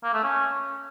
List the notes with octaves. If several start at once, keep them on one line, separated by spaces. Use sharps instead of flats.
A#3
A3
C#4